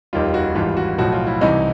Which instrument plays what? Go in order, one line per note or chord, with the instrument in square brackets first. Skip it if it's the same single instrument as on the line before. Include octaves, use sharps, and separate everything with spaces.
[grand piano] F1 D#2 D#3 G3 F4
F#4
G#1 G#2 E3 G3 F4
F#4
B1 A2 F3 F#4
F4
E4
C2 C3 E3 D#4